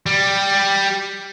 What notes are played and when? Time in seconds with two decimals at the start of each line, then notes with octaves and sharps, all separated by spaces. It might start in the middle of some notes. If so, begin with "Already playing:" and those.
0.06 G3